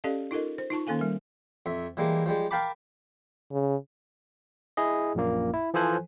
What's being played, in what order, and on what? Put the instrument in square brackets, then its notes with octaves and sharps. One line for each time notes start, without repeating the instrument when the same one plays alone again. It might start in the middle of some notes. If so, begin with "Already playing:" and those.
[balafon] C#4 G4 A4 D5 D#5 F5
D#4 F4 A4 A#4 D#5
C5
D#4 F4 A5 C#6
D#3 A#3 C#4 A4 F5 G#5
G3 A#4
[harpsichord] F2 E5
E3 G3 G#3 A#3
F3 G3 G#3
A#4 F5 G5 A5 B5 D6
[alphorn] C#3
[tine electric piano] E4 G#4 D#5
A#1 F#2 A#2 A#3
E4
E3 F3 A4 C5 G#5 F#6